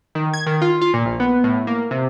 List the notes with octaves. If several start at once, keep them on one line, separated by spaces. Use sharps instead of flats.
D#3
G#6
D#3
F4
F4
A#2
A#1
B3
A2
A#3
C3